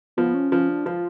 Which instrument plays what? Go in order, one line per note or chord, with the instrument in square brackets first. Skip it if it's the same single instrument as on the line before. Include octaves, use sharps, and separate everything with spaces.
[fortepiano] F3 [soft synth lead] B3
[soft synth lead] C#4
[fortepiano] F3 [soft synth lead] C#4
[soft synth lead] D4
[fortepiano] F3 [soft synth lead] F4